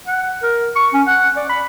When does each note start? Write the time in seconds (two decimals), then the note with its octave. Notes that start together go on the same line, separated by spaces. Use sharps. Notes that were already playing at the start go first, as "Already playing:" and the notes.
0.07 F#5
0.43 A#4
0.76 C#6
0.93 C#4
1.07 F#5
1.37 D5
1.49 B5